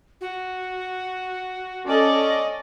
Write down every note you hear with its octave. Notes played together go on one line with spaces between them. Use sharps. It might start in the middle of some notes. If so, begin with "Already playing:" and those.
F#4
C#4 A4 D5 D#5